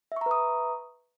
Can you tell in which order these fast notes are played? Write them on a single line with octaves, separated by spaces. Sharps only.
E5 C#6 A#5 B4 D#6